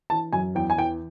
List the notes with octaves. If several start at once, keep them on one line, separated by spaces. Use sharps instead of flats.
E3 A5
F#2 G#5
E2 G5
G#5
E3 G5